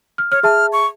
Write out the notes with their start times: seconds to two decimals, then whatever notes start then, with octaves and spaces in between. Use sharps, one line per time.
0.18 F6
0.32 C#5 F6
0.43 G#4 E5 A5 F6
0.73 C#6